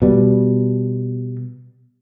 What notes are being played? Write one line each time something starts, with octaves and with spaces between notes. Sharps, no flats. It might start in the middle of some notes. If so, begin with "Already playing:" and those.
B2 G3